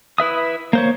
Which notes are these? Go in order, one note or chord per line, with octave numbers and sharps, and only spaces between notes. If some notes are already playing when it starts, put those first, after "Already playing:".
E4 B4 E5 D#6
A#3 C5 C#5